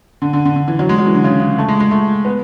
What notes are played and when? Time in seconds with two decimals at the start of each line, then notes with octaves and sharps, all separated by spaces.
0.22 D3
0.33 D3
0.45 D3
0.56 D3
0.68 E3
0.79 F#3
0.89 G#3
0.99 F#3
1.06 E3
1.15 D3
1.24 C#3
1.40 C#3
1.59 A3
1.68 G#3
1.80 G#3
1.91 A3
2.25 B3